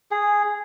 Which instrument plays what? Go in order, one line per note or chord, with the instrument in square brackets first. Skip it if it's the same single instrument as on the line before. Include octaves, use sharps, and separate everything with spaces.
[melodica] G#4